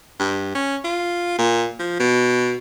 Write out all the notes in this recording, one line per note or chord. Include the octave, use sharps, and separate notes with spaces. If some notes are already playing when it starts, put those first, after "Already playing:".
G2
C#4
F4
A#2
F3
B2